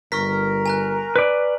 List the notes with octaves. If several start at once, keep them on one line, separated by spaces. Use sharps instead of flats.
G1 A#4 C#6 F6 B6
G#5 A#5 F#6
B4 D5